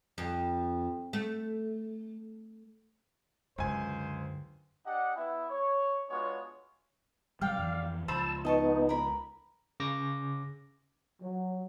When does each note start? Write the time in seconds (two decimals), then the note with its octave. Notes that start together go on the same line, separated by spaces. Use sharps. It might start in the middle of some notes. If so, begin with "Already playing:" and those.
0.18 F2
1.13 A3
3.58 C#2 F#2 D3 C5 G#5
4.85 D4 G4 D#5 F#5
5.17 B3 E4 E5
5.49 C#5
6.10 G#3 B3 D4 F4 F#4 C#5
7.41 B2 F#3 G3 D5 F5 G5
7.58 F2 E3
8.08 C#2 F3 C5 A5 B5 E6
8.45 B3 D#4 D#5 A5 C#6
8.89 A#4 B5
9.80 C#3 D6 A#6
11.22 F#3